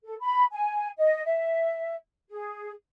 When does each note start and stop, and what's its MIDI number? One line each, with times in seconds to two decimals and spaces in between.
0.04 0.14 69
0.20 0.44 83
0.52 0.88 80
0.97 1.22 75
1.25 1.94 76
2.29 2.70 68